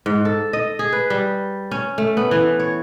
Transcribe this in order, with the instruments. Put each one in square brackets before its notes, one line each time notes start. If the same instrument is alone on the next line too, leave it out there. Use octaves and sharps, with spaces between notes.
[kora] G#2
A4
D#5
G#4
B4
G3
C#4
A3
B3
E3
C#5